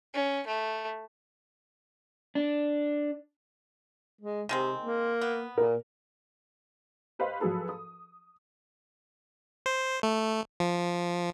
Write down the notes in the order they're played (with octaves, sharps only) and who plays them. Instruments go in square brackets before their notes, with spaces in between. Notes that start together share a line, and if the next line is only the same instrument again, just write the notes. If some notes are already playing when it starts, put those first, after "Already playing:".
[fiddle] C#4
A3
[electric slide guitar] D4
[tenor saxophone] G#3
[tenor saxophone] C3 [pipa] D#3 G#3 C4
[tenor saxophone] A#3
[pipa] B3
[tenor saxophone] A#2 [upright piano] A#4
[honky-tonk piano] G4 B4 C5 D#5 F5
F3 F#3 G#4 A4 B4
D#6
[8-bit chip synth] C5
A3
F3